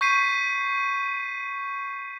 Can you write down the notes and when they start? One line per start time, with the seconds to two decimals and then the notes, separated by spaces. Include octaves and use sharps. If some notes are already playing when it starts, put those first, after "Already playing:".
0.01 C#6 G6 B6 C7 D#7